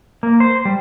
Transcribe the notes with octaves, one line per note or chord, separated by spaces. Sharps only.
A#3
C5
G3